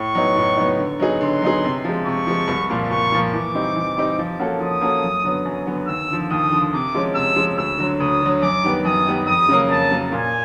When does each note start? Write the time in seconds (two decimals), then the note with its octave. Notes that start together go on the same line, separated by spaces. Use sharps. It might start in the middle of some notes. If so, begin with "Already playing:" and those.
Already playing: A2 C#6
0.15 F#3 B3 D#4
0.36 A2
0.57 F#3 B3 D#4
0.79 D3
1.00 F#3 B3 D#4 G#4
1.21 D3 C6
1.42 F#3 B3 D#4 G#4
1.64 C3
1.84 F3 G#3
2.06 C3 C#6
2.27 F3 G#3
2.48 C2
2.69 A#2 F3 A#3
2.91 C2 C#6
3.12 A#2 F3 A#3
3.33 E3 D6
3.55 G3 C4 D#4
3.76 E3
3.97 G3 C4 D#4
4.19 F3
4.39 A#3 C#4 F#4 A4
4.60 F3 D#6
4.81 A#3 C#4 F#4 A4
5.03 F#2
5.24 D3 F#3 B3
5.45 F#2
5.67 D3 F#3 B3
5.87 D#2 E6
6.08 D3 F3
6.30 D#2 D#6
6.51 D3 F3
6.73 C3 D6
6.94 F3 G#3 C#4
7.15 C3 E6
7.36 F3 G#3 C#4
7.57 D2 E6
7.78 D3 F#3
8.00 D2 D#6
8.21 D3 F#3
8.42 F#2 D6
8.63 D#3 G3 B3
8.85 F#2 D#6
9.06 D#3 G3 B3
9.27 F2 D#6
9.48 C#3 F#3 A#3
9.69 F2 A5
9.91 C#3 F#3 A#3
10.12 A#2 G#5